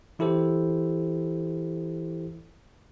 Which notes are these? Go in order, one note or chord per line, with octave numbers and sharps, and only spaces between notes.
E3 E4 G4 A4 C5